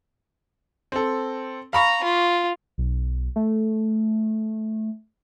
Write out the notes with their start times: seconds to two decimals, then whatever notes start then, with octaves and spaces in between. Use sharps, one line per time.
0.92 C4 A4
1.73 F5 A#5 B5 C#6
2.04 F4
2.78 B1
3.36 A3